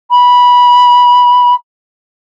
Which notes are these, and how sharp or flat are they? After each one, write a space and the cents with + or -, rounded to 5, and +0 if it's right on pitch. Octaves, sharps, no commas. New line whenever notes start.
B5 -15